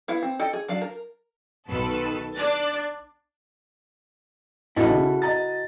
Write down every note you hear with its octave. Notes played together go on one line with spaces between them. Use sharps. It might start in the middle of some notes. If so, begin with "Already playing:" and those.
B3 E4 F5
C4
A4 D#5 G5
G#4
F#3 D4 F5
A#4
B1 D#3 A4 B4 E6
D4 F#6 A6
A1 E4 F#4 A4 D#5
C#3
D#5 A#5 A6